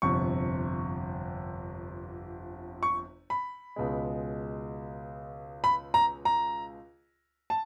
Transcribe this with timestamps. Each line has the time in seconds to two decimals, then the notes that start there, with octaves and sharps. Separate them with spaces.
0.02 G1 F2 C3 C#6
2.83 C#6
3.30 B5
3.76 C#2 B2 G#3
5.64 B5
5.94 A#5
6.25 A#5
7.50 A5